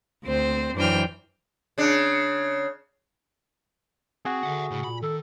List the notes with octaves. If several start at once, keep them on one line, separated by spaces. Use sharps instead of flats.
D2 C4 C5
F#2 E3 D4 C5 G5 F6
C#3 D4
C4 F#4 G#4
D3 E5 F#5
A2 C#3
A#2 B5
D#3 A4